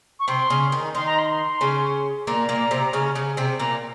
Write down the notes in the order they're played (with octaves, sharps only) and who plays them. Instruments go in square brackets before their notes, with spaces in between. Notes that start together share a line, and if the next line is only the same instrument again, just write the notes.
[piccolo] C#6
[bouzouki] C3 C4 [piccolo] C6
[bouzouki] C#3 C#4
D#3 D#4
[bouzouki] D#3 D#4 [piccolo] C6
[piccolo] A#5
C6
[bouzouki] C#3 C#4
[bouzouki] A#2 A#3 [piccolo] A#5
[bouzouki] A#2 A#3
C3 C4
C#3 C#4
C#3 C#4
C3 C4
[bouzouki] A#2 A#3 [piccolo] A#5